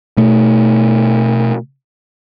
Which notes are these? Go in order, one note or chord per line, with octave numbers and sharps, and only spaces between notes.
B2 A3